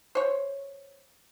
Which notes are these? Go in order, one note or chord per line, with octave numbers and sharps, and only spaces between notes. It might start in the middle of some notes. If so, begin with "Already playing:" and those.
C5 C#5